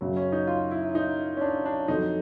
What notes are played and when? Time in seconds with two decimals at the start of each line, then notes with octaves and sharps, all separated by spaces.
0.01 F#2 C#3 F#3
0.17 C#4
0.32 D#4
0.47 F4
0.71 E4
0.95 D#4
1.37 C#4
1.41 D4
1.65 D4
1.88 F2 D3 F#3 D#4